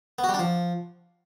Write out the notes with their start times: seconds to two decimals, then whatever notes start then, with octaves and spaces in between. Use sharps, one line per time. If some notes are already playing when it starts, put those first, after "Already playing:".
0.19 B3
0.24 F#4
0.29 G3
0.34 D4
0.39 F3